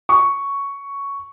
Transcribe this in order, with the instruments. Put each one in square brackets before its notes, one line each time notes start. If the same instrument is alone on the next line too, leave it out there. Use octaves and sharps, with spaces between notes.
[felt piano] C#6